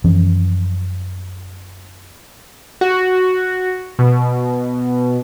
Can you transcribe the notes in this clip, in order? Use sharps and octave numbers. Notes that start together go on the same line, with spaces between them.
F#2 E3 F3 C#4
F#4
B2